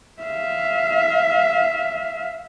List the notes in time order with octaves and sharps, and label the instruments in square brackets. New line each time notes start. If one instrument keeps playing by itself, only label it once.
[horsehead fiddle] E5 F5